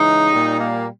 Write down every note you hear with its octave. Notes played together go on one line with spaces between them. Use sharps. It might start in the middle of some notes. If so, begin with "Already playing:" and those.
Already playing: C#3 E3 G#3 D#4
A#2 G3
A#3